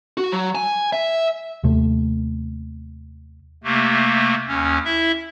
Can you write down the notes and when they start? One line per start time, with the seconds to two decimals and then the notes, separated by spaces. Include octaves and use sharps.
0.17 F#4
0.32 F#3
0.55 G#5
0.93 E5
1.63 D#2 C3 A3
3.64 C3 A3 A#3
4.48 D#2 C#4
4.85 E4 E5